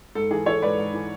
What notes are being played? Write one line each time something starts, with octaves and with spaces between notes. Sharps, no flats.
G#2 A4
E3 G#4
E3 A4 C#5
G#2 B4 D5
G#2
E3